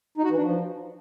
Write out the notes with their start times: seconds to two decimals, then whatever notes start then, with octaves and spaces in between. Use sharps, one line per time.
0.18 D#4
0.24 F#4
0.31 E3
0.37 D4
0.44 F3